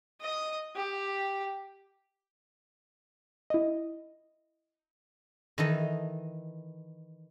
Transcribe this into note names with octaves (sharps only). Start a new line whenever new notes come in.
D#5 D#6
G4
E4 D#5
D#3 E3 A4 D#5